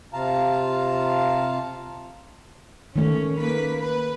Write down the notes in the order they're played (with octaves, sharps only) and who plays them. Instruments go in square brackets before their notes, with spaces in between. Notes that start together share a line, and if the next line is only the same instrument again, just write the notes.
[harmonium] C3 F4 F5 A5 A#5
[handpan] D#3 A3 [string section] C#4
[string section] A#3 B4 B6
B4